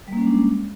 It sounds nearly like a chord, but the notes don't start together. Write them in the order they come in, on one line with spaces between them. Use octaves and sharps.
G3 A#3 C#4 G#3 D4